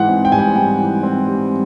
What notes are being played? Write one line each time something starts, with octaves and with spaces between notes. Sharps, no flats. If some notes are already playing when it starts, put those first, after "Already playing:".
Already playing: G#2 E3 F#5
C4
G5
G3 G#5
G5
G#2 G5
E3
C4
G3